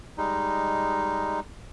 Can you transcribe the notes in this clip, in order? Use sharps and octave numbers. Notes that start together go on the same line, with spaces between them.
G3 G#3 D#4